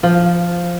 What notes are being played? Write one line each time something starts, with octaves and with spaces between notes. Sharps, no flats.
F3